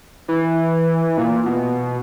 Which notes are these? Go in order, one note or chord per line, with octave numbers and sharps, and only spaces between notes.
E3
A#2
B2